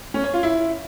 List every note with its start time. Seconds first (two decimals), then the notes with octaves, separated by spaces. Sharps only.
0.14 C#4
0.24 C#5
0.33 F4
0.43 E4